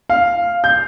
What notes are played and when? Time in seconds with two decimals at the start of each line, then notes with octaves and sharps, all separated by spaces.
0.10 F5
0.64 G6